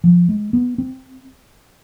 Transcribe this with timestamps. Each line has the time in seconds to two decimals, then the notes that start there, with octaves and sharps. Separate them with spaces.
0.04 F3
0.29 G#3
0.53 B3
0.78 C4